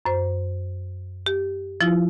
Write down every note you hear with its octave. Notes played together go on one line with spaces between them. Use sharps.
F#2 C5
G4
F3 E4 F4